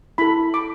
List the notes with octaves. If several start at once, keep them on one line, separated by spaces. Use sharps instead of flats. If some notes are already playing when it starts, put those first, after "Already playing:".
E4 A4 B5
D6